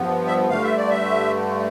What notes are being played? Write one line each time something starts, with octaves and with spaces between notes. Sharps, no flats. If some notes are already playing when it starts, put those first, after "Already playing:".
Already playing: G2 F3 B3
E5
G2 D3 A3 F5
E5
D5
E5